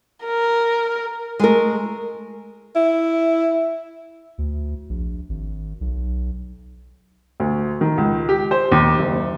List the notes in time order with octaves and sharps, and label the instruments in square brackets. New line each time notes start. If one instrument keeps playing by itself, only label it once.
[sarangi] A#4
[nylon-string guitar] G#3 A3 A#4
[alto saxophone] E4
[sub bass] D2
A#1
G#1
B1
[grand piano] D2
D#3
C#2
G4
C5
D#2
F#1